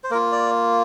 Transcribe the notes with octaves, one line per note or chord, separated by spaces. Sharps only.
C5
A#3 F4 A#4
D5